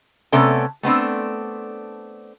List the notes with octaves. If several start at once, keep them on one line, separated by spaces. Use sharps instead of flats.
C3 A3 B3 C#4 A4 D5
A3 B3 C4 D4